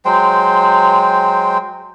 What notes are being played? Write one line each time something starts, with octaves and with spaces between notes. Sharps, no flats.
F#3 G#3 C5 G5